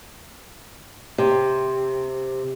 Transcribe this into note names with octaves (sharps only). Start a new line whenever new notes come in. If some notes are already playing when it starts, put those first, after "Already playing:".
C3